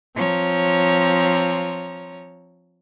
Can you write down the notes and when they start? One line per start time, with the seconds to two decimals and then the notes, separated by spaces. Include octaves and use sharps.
0.16 F3 C4 C#5 A#5